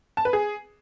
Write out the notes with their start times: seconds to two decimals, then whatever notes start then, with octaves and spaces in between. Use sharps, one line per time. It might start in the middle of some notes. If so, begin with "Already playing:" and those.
0.17 A5
0.25 B4
0.33 G#4